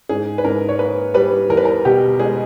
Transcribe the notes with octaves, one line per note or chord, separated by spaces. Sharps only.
G#2 G#4
B4
G#2 A#4
C#5
A#3 B4
G3 B4
E2 A#4
B4
A#4
B2 G4
G#3 G#4